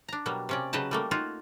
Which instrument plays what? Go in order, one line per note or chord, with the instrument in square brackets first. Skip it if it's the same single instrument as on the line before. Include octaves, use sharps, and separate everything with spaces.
[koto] D4 A#5
B2 F#3 G3 A#3
C3 C#4 D5
C#3 F#3 B4 D#5 G5 A5
G3 A3 A#3
D#4 F4 F#4